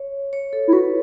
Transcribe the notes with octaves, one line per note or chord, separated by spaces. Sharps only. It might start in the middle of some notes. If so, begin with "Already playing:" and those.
Already playing: C#5
C#5
A4
E4
F#4 B4